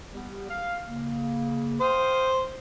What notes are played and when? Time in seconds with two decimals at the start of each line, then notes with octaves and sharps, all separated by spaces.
0.13 G3 B3 G4
0.49 F5
0.86 C#3 A#3
1.81 C5 F5 G5 D#6